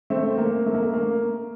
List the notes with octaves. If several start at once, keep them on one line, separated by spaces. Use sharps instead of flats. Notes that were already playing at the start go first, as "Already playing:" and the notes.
A3 C4
A#3
A3
A#3
A3
A#3